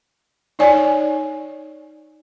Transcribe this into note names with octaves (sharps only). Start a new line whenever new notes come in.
D#4 C#5 D5 G#5